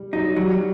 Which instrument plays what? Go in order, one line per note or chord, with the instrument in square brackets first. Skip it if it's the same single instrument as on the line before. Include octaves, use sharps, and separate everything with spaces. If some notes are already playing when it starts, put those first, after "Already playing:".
Already playing: [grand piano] G3
[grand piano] F#3 [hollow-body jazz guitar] D#4
[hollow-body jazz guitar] F#3 [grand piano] G3